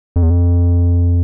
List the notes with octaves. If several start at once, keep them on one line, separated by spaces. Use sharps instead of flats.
F2
E2
F2